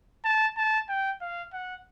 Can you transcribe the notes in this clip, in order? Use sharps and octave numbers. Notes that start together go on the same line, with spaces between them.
A5
A5
G5
F5
F#5